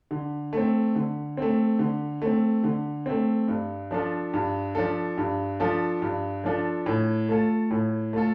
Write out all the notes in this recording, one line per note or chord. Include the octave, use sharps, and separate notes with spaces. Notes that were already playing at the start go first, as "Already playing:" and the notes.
D3
A3 C4
D3
A3 C4
D3
A3 C4
D3
A3 C4
G2
F3 D4 F4 A4
G2
F3 D4 F4 A4
G2
F3 D4 F4 A4
G2
F3 D4 F4 A4
A2
A3 F4 A4
A2
A3 F4 A4